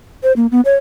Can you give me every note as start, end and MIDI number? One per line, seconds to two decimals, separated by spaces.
0.23 0.32 72
0.36 0.47 58
0.51 0.61 59
0.65 0.75 73